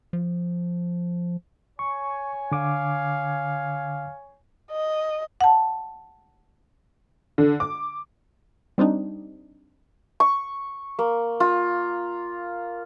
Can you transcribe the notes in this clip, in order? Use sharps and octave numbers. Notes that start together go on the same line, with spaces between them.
F3
C#5 G#5 C#6
D3 F5 D6
D#5
F#5 A5
D3
D6
G3 C4 D4 D#4
C#6
A#3
F4